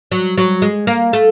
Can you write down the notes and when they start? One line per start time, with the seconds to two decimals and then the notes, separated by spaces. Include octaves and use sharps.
0.12 F#3
0.37 F#3
0.62 G#3
0.87 A#3
1.13 A3